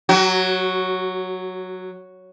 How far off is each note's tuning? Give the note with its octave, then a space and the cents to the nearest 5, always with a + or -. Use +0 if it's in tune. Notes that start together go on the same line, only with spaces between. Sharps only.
F#3 +0 F#4 +35